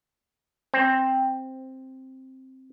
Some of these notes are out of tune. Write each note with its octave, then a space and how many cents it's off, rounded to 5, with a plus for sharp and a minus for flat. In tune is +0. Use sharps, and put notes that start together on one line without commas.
C4 +5